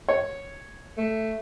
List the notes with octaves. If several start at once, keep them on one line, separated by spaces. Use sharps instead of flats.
C#5
A3